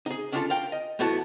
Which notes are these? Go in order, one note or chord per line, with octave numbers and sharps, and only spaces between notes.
D#4 G#4
C#4 D4 F4 A4
A#4 F5 G5
D#5
E2 A3 B3 E4 F#4 A5